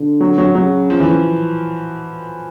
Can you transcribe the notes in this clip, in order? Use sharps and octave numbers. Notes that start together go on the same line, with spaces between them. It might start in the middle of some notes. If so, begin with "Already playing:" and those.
Already playing: D3
F#3
F#3
C#3 F#3
F3
E3
F3